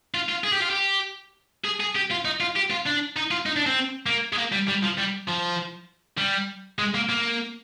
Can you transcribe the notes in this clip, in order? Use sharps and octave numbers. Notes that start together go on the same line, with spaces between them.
F4
F4
G#4
G4
F4
G4
G#4
G#4
G4
F4
D#4
F4
G4
F4
D4
D#4
F4
D#4
D4
C4
A#3
G#3
A#3
G3
G3
F3
G3
F3
G3
G#3
A#3
A#3